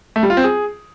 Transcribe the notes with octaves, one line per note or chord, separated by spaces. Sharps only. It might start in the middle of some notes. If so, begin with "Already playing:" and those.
A3
G3
F4
C4
G#4